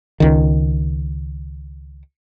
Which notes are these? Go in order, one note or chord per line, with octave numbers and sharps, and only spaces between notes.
C#2 D#3